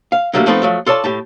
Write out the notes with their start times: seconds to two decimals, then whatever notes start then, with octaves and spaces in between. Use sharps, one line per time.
0.12 F5
0.33 D3 F#3 G3 A3 A#3
0.46 F3 A3 B3 C4 D#4 A4
0.62 F3 F#3 A3
0.86 F4 A4 C#5 D5 A5
1.04 A2 G4 A5